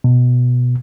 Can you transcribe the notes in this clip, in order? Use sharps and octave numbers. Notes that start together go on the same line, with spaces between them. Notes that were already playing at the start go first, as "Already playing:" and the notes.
B2